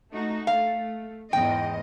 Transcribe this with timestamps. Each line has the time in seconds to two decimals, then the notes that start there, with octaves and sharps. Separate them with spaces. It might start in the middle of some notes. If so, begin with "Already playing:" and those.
0.12 A3 D#4 F#4
0.47 A3 F5
1.33 E2 G#2 D#5 G5